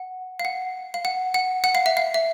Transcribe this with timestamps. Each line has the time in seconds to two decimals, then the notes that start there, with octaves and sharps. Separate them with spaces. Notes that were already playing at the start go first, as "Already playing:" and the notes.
Already playing: F#5
0.39 F5
0.45 F#5
0.94 F5
1.05 F#5
1.34 F#5
1.64 F#5
1.75 F5
1.86 E5
1.97 F5
2.14 E5